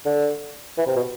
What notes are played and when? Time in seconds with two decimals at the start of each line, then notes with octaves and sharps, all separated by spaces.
0.06 D3
0.78 E3
0.87 C3
0.96 B2